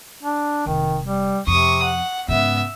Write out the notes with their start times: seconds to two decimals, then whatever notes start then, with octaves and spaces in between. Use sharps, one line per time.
0.23 D4
0.66 F1 D#3
1.03 G3
1.47 F2 C3 C#6 D#6
1.83 F#5
2.28 G#2 C#3 B3 E5